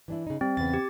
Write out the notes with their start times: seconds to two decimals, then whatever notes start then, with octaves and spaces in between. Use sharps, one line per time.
0.08 E3 D4 E4
0.27 C#3 D#4
0.41 G3 C4
0.57 E2 C#3 B3 A6
0.74 G4